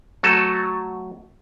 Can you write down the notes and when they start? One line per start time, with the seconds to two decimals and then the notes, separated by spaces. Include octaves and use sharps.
0.23 F#3 A3 F#4 A4